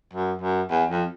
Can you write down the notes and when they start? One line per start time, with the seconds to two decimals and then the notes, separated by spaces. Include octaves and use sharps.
0.13 F#2
0.41 F#2
0.70 E2
0.90 F2